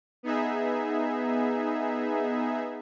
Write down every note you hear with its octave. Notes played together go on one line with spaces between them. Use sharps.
B3 D#4 G#4 E5